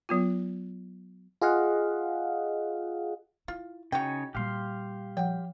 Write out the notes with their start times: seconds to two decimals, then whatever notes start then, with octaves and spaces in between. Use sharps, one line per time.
0.09 F#3 B3 F4
1.41 F4 G#4 D#5 F5 F#5
3.48 E4 F4
3.92 C#3 D#4 F#4 C#5 G5
4.35 A#2 G3 G4 F5 C6
5.17 F3 F#5 G5